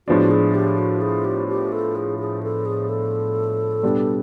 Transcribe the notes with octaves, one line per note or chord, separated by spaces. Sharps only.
A2 F3 G#3 B3 D4 F#4
G#4
G4
F#4
G#4
G4
G4
A4
G#4
G#4
A4
G#4
A4
B2 G3 B3 D4 G4